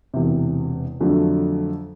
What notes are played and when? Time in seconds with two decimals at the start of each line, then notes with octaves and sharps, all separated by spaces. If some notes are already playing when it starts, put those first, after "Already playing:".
0.14 E1 E2 C3
1.01 F2 D3 F#3 A3 D4